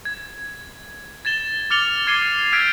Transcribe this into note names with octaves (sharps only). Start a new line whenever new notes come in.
G#6
G#6 A6 E7 G7
D6 F6 A6 C#7 F7 G7
D6 G#6 C7 C#7 D#7 G7
E6 F6 G6 G#6 B6 D7